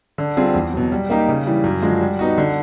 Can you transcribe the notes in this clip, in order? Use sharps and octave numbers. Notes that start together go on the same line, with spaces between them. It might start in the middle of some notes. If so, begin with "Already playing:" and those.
D3
G3 C4 F4 G#4
E2
B2 F#3
G3
A#3 D#4 G4
C#3
E3 G3
F#2
D3 F3 G#3
G3
B3 D#4 F#4
D3